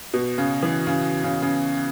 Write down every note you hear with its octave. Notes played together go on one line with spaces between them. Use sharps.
B2
C#3
E3
C#3
C#3
C#3